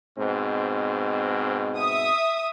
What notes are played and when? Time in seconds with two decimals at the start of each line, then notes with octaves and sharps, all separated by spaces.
0.18 G#2 B2 C4
1.77 E5 D#6